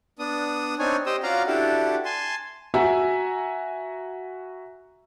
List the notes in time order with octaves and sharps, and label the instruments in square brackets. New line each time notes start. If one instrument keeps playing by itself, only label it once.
[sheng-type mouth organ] B3 D4 D#6
C4 D4 D#4 C#5 G#5
G4 C5 D#5 D#6 E6
C#4 F4 F#4 D5 F5 A#5
D4 E4 F#4 G4 A4
G#5 A5 C6
[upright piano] F#4 E5 F#5 G#5 A#5 E6